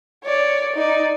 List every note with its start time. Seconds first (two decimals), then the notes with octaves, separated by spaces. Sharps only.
0.24 C#5 D5
0.75 D#4 D5